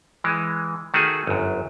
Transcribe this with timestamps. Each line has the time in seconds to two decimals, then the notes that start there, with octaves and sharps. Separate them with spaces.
0.24 E3 G#3
0.94 D#3 A3 F#4 G#4
1.27 G1 F#2